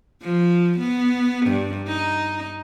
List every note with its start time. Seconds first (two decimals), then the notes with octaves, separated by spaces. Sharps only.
0.23 F3
0.79 B3
1.46 G2
1.87 D#4